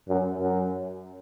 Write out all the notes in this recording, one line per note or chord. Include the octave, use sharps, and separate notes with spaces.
F#2
F#2